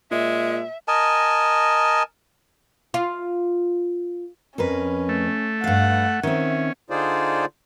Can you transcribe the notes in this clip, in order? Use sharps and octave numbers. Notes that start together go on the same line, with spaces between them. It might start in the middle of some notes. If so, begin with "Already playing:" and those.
A#2 G#3 E5
A#4 D#5 G#5 A5
F4
F2 C#4 A#4 B4
A3
G2 F5 F#5
D#3 C4 C#4 E5
D3 D#4 F4 G#4 C5 D5